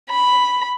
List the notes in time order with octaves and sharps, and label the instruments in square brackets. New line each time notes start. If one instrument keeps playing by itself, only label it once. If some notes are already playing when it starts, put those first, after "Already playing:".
[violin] B5